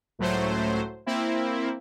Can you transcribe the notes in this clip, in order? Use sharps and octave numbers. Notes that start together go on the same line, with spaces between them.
C#2 A2 F#3 A3 C5
A#3 C4 E4